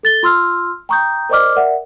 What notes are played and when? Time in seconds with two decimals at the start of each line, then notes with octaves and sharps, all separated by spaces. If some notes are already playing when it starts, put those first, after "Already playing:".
0.03 A4 A6 G7
0.23 F4 C6 E6 F6
0.89 G5 A#5 C#6 D#6 G6
1.29 A#4 C5 D5 D#5 D6 F6
1.56 A#4 D5 E5 F#5